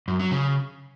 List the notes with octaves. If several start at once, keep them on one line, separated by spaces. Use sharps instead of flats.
F#2
F#3
C#3